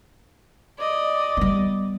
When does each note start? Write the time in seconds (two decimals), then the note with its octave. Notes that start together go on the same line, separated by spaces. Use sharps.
0.78 D5 D#5
1.37 G3 B3